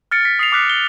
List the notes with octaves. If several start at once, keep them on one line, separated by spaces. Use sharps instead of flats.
F6 A6 C#7 D7
B6
D#6 C7 F7
D6 F6 F#6 B6
G7